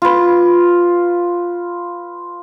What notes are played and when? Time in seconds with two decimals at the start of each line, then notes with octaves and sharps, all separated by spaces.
0.02 F4 B4